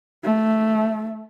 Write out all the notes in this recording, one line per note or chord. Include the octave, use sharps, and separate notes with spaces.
A3